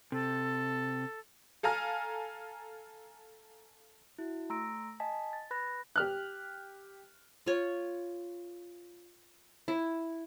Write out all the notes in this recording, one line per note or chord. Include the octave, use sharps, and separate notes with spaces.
C3 A4
A4 F5 G#5 A#5 F6
E4 F#4
A3 A#5 C6 E6 A#6 D7
D#5 G#5 A5 B6
A6
B4 B5 F#6 A#6
G4 F6 F#6
F4 C#5
E4